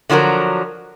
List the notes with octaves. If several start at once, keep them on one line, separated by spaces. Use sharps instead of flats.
D3 F3 F#3 F#4 A#4